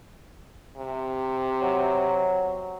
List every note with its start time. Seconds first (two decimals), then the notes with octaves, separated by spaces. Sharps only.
0.77 C3
1.62 F#3